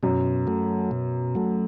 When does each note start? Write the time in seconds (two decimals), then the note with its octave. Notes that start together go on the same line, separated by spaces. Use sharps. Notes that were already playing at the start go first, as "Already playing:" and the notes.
0.03 F#2 B2
0.47 F#3 A3
0.91 B2
1.35 F#3 A3